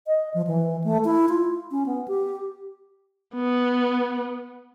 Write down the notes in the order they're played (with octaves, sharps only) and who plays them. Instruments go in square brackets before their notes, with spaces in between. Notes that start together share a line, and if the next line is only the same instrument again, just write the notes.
[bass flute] D#5
F3
E3
A3
E4
F4
C#4
B3
G4
[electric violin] B3